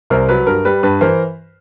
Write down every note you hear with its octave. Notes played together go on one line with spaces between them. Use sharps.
C2 A#4 C5
F#3 B4
G2 A#4
G3 B4
G2 B4
E3 A#4 C5